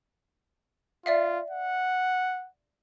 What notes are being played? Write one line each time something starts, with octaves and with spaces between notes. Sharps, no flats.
F4 D5 E5 F5
F#5